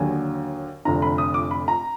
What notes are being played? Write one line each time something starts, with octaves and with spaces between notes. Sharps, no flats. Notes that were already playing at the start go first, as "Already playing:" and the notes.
Already playing: D#2 D3 F#3 G#5
F1 F2 D3 A#5
B5
D#6
D6
B5
A#5